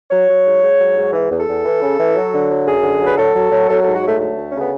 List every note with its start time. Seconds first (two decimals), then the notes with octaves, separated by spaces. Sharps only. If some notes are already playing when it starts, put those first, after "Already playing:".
0.10 F#3 C#5
0.28 F#3
0.45 G#2
0.62 G#2
0.79 F#3
0.96 G#2
1.13 E3
1.30 E2
1.39 A4
1.47 E2
1.64 E3
1.81 C#3
1.98 E3
2.15 F#3
2.33 D3
2.50 F#3
2.66 F#2 G#4
2.83 D3
3.01 F#3
3.06 B4
3.18 F#3 A4
3.34 F#3
3.52 F#3
3.68 F#3 A4
3.81 G#2 A4
3.95 F#4
4.02 F#3 A3
4.19 D2 A3
4.37 D2
4.51 C#3 C#4
4.61 B3